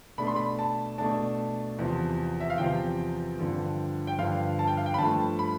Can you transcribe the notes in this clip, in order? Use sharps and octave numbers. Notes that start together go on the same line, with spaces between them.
B2 A3 D4 B5
C6
B5
A5
B2 A3 D4 A5
E2 C3 F3
E5
F5
E2 C3 F3 G5
G2 D3 F3
G5
G2 D3 F3 F5
A5
G5
F5
G5
B5
G2 F3 A3 A5
B5